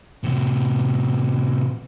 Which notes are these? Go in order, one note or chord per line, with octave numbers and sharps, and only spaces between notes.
A2 C3